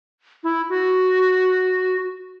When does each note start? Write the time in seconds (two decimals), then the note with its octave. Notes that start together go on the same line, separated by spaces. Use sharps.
0.44 E4
0.69 F#4